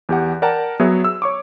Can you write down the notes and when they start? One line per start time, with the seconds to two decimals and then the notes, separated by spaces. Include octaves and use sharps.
0.09 E2 G4 F#5
0.42 A#4 D5 F#5 G5 A5 A#5
0.80 F#3 B3 G#4 C#5 E5
1.04 E6
1.22 C#5 C#6 D6